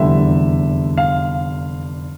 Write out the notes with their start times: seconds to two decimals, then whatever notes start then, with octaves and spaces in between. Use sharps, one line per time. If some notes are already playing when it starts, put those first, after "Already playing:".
Already playing: F1 E2 D3 G3 E5
0.98 F5